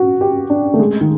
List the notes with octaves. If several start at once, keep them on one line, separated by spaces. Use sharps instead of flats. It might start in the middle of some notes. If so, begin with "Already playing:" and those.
Already playing: F#4
G4
D4
A3
G#3
D#3